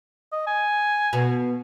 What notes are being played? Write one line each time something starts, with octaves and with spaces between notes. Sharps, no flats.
D#5
G#5
B2